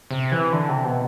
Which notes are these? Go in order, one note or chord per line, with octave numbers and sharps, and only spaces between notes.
C3
E3
D3
C3
B2